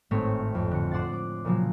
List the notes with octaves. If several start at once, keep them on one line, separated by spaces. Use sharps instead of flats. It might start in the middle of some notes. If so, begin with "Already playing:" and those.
G#1 A2 A3 C4 C#5
F2
D3 C#7
C5 D5 F#5 C6 A6
D6
A#2 C#3 F3 F#3